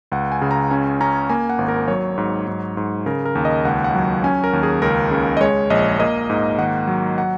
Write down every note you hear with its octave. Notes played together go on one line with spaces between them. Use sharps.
C#2 F#5
G#5
C#3
A#5
C#4 G#5
C#4 A#5
A#3 G#5
F#5
G#1
A#4
F#3 C#5
G#2
G#2
G#2
C#3 A#4
A#4
D#2
D#5
C#2 F#5
F#5
F#3
C#4 G#5
A#4
D#2
G#4
C#2 A#4
C#3
D#5
G#3 C#5
A#1 D#5
A#3 D#5
G#2
D#3 F#5
F#3
F#5